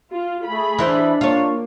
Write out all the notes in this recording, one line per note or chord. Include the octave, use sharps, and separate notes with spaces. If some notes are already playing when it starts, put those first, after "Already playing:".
F4
A3 G#4 B5
E3 D4 E4 C5
A#3 F4 C#5